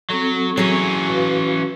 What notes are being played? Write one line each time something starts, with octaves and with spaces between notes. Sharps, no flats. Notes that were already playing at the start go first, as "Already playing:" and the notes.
F#3 C4 A4
E3 F#3 C#4 G#4
F#4 B4 F5